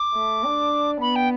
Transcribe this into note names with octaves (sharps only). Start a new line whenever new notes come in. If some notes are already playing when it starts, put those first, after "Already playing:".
Already playing: D6
A3
D4
B3 B5
G5